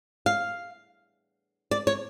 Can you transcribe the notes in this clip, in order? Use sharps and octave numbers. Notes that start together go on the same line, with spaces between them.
F5
D5
C#5